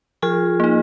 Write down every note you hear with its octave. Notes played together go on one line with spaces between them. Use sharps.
F3 F4 G#4
A#3 D#4